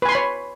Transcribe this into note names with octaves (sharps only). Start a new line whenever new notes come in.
B4 C#5 G#5 B5 C6